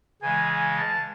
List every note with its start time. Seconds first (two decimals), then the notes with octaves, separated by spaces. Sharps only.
0.22 C#3 E3 G#3 G#5
0.50 G#5
0.78 A5